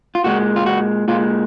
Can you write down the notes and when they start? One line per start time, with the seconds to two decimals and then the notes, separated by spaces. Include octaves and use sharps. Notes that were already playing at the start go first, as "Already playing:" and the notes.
0.15 F4
0.24 A#2 G#3 F#4
0.56 F4
0.66 F#4
1.08 A#2 G#3 F4